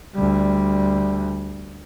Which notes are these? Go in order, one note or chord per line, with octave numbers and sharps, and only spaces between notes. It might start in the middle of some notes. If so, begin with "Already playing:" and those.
D2 G3